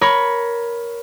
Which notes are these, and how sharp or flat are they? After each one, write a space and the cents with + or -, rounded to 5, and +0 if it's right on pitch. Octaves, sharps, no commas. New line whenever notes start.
A#4 +15 C#5 +10 B5 +0